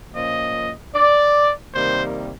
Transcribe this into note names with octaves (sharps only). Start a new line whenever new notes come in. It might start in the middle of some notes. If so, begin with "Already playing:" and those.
A#2 F3 A#3 C#4 D#5
D5
C3 D#3 G3 A#3 C5